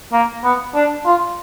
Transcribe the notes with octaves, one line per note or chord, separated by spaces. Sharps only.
A#3
B3
D4
F4